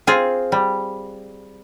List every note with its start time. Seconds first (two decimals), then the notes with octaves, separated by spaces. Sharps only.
0.07 C4 F4 G#4
0.52 G3